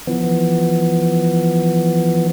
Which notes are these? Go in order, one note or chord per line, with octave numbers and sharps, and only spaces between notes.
E3 F3 B3